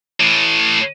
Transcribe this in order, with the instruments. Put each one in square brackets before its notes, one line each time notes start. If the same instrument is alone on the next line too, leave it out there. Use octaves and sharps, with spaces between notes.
[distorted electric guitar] A2 E3